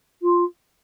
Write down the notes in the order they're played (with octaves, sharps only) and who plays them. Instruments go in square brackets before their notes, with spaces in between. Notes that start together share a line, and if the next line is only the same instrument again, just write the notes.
[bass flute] F4